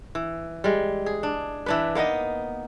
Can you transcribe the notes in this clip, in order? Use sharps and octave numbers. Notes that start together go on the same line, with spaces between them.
E3
G3 G#3
G#4
D4
E3 D4 B4
A#3 B3 D#4 D#5